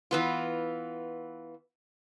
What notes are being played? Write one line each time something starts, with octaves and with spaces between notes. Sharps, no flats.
E3 B3 F4